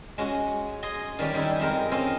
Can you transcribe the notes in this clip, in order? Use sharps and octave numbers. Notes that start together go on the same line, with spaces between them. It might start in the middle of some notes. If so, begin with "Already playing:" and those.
G#3 C#4 F#4
G#4 D#5 G#5 C6
D#3 G3 C#4 G4
D#3 G3 D#4 E4
F2 G#3 A#4
C4 C#4 D#5 F5